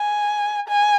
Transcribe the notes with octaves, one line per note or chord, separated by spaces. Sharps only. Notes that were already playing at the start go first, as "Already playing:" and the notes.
Already playing: G#5
G#5